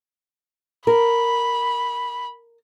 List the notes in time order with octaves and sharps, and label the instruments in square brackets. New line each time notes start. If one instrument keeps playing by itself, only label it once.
[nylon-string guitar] A#4 [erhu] B5